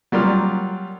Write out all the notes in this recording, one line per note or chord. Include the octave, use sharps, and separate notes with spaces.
F#3 G3 A#3 F4 G4